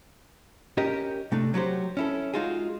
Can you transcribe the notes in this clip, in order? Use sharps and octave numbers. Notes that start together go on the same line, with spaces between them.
C#4 G4 A#4 D#5
C3 A3 D4
F#3 F#4 G4 C5
C#4 E4 A4
G#3 D#4 F4 F#4 G#4